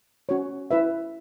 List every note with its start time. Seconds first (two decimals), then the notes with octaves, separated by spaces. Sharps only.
0.29 C#4 F#4 C#5
0.71 E4 B4 E5